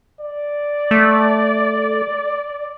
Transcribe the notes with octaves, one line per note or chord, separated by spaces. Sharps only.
D5
A3